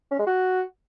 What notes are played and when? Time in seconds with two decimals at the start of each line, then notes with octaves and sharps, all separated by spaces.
0.11 C#4
0.19 G#3
0.27 F#4